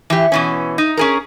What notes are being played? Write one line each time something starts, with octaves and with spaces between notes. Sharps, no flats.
E3 G4
B2 E3 C#4
D#4
C#4 G#4 A#4